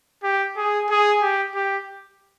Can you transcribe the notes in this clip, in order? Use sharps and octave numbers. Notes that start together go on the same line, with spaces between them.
G4
G#4
G#4
G4
G4